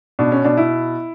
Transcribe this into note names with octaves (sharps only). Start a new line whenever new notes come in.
B2 D4
C#4
B2 D4
E4